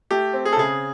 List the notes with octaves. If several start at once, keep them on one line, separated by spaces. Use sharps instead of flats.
A3 G4
C4
G#4
A4
C#3 G#4